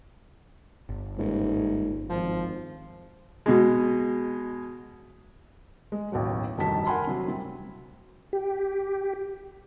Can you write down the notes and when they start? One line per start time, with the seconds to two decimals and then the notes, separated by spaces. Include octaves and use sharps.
0.89 G1
1.18 D#1 G#2
2.09 G#1 F3
3.46 B2 G#3
5.92 G#3
6.12 A1 D#2 B2 F#3
6.58 F1 D2 G2 D#3 A5 B6
6.87 A#4 F#5 G#5 B5 C6
7.07 C3 F#3
7.28 C3 G3
8.33 G4